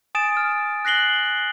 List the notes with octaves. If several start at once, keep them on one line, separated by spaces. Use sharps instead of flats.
G#5 D#6 A6 D7 E7
F6
F#6 A#6 C7 F#7 G7